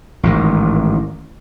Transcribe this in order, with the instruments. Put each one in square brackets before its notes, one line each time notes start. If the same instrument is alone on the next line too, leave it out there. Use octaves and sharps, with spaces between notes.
[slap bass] A1 G#2 D#3